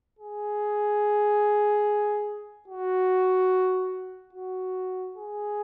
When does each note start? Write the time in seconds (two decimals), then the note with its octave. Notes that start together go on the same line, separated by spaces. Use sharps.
0.19 G#4
2.68 F#4
4.33 F#4
5.17 G#4